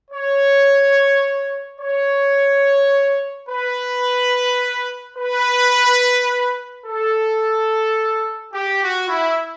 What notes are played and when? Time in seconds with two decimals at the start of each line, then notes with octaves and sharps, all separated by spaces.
0.11 C#5
1.80 C#5
3.48 B4
5.17 B4
6.85 A4
8.53 G4
8.82 F#4
9.09 E4